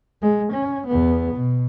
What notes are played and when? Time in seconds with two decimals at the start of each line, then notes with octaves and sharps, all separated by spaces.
0.22 G#3
0.53 C#4
0.87 E2 B3
1.35 B2